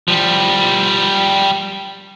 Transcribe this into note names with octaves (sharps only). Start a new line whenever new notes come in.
F3 G3